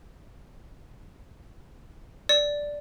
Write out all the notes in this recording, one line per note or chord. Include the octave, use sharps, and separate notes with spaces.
D5